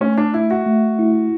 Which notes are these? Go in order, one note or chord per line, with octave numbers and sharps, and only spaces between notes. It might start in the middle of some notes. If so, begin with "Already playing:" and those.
A3 C#4
D4
E4 E5
F#4
A3
E4